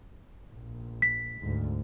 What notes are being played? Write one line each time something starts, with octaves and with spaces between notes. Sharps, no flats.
A#1
B6
D2 G#2